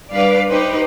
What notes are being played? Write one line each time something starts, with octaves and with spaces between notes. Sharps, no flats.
G3 D4 B4 D5 F5
D#4 G4 B4 C5